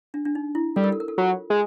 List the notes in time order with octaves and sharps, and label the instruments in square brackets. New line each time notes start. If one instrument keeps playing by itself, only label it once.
[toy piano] D4
D4
D#4
E4
[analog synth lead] G3 [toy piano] A4
[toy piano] A#4
A4
A#4
A4
[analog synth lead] F#3 [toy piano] F4
[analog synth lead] G#3